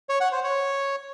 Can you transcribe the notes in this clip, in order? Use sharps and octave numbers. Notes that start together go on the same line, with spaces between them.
C#5
F#5
C5
C#5